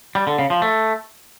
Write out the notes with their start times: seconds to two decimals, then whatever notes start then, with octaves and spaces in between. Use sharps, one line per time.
0.15 G3
0.27 D3
0.39 C#3
0.50 F3
0.62 A3